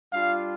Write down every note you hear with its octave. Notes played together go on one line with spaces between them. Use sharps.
G3 D4 F4 F5